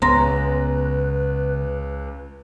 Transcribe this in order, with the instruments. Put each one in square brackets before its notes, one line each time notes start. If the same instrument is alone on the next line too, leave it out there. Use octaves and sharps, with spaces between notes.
[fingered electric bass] C#2 [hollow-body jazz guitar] C#3 B3 C#4 [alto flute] B4 [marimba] A#5 C6 A#6